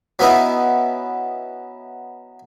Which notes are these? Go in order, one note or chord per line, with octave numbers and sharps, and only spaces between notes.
F#3 B3 C#4 D#4 E4